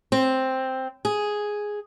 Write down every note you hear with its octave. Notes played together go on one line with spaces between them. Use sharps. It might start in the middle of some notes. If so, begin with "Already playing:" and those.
C4
G#4